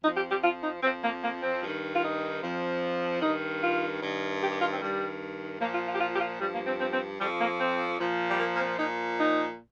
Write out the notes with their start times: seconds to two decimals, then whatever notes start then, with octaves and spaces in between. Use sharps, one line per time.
0.03 F2 D#4
0.06 F3
0.16 G4
0.30 G4
0.43 F4
0.63 D#4
0.83 F2 F3 C4
1.03 A#3
1.23 A#3
1.42 C4
1.62 G2 D#3
1.95 F4
2.03 D#4
2.41 F2 F3
3.21 G2 D#3 D#4
3.61 F4
4.01 G2 D#3
4.41 G4
4.51 G4
4.61 F4
4.71 C4
4.81 G2 D#3 G3
5.60 A#2 F3 A#3
5.74 F4
5.87 F4
5.94 G4
6.01 F4
6.15 G4
6.20 F4
6.40 G2 F3 G3
6.53 A#3
6.67 C4
6.80 C4
6.93 C4
7.20 F2 F3 G3
7.39 A#3
7.59 C4
7.99 A#2 F3
8.30 G3
8.39 A#3
8.55 A#3
8.59 C4
8.79 A#2 F3 D#4
9.19 D#4